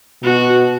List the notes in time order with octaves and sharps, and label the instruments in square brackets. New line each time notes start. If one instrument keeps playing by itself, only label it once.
[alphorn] B2 [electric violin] F#4